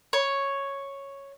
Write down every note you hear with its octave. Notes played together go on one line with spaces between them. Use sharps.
C#5